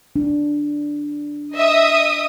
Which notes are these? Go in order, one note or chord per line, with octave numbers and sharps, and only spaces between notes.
D4
D#5 E5 D#6